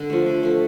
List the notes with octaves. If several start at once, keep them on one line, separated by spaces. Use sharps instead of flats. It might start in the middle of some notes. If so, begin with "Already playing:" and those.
Already playing: D3
F3 A3
D3
F3 A3